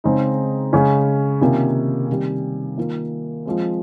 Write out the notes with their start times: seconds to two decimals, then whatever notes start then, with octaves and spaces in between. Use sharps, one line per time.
0.04 C#3 G#3 C4 D#4
0.73 C#3 G#3 C#4
1.41 C3 D#3 A#3 C#4 F4
2.09 C3 D#3 G3
2.78 D#3 A#3 F4
3.45 F3 G#3 C4